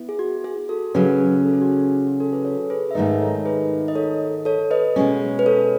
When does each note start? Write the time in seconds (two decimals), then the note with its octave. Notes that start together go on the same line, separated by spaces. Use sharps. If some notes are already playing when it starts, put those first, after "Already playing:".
Already playing: B3 E4
0.09 G#4
0.19 F#4
0.44 G#4
0.69 F#4 A4
0.95 C#3 F#3 C#4 G#4 B4
1.45 A4
1.53 G#4
1.62 F#4
1.70 G#4
1.95 E4
2.07 F#4
2.20 F#4 A4
2.33 G#4 B4
2.45 A4 C#5
2.70 G#4 B4
2.91 E5
2.95 G#2 D#3 A3 D#4 B4 D#5
3.20 A4 C#5
3.45 G#4 B4
3.88 D#5
3.95 A4 C#5
4.45 A4 C#5
4.71 B4 D#5
4.96 B2 G#3 C#4
5.39 B4
5.46 A4 C#5